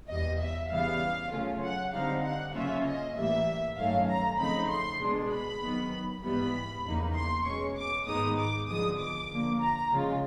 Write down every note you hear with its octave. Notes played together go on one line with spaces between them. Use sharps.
E2 B2 G3 D#5
E5
C#3 E3 G3 B3 F5
C#3 F#3 A3 C#4 F4
F#5
D3 G3 C4 D#4 F5
F#5
C#3 F#3 A#3 C#4 F4 E5
D#5
A2 E3 G3 A#3 E5
G2 D#3 F#3 A3 C#4 F5
A#5
C#3 F3 A3 C4 D#4 B5
C6
B2 G#3 B3 D4
B5
D#3 F#3 B3
G#2 E3 G3 B3 B5
E2 C#3 F3 A#3 D#4
C6
B2 G#3 C#4 C#6
D6
G#2 D#3 G#3 B3 D#4 D#6
D6
D3 F3 G#3 B3 D#6
D6
D3 F3 A#3
A#5
C#3 F3 G#3 C#4 F4